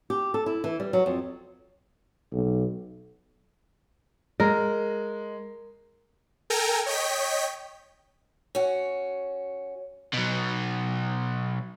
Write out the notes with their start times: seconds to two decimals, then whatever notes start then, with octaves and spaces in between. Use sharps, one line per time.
0.10 G4
0.34 A4
0.46 E4
0.64 E3
0.80 G3
0.93 F#3
1.06 F2
2.33 B1
4.40 G#3 A#4
6.50 A4 A#4 G5 G#5 A#5
6.86 C#5 D#5 G5 B6
8.55 C#4 F#4
10.14 B2 F#3